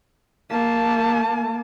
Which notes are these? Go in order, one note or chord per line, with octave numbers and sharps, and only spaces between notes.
A#3 A5